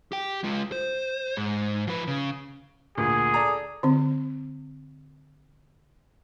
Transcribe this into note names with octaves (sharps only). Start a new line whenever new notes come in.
G4 G5
G#3 F4
C5
G#2
F3 B4
C#3
D2 A#2 G#4
A4 D5 A#5
D3 C4